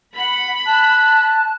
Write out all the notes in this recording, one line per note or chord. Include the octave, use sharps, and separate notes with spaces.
F#5 B5
A5 F#6